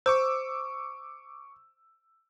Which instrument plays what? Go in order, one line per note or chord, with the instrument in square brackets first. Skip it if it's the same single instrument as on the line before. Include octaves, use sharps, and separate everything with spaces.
[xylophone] C5 [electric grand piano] C#6 D6 E6